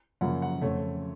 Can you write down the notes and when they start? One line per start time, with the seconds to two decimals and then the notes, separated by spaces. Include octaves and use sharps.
0.21 F#2 C#3 F3 A#3 F#5
0.42 F#5
0.62 F2 C#3 A3 C#5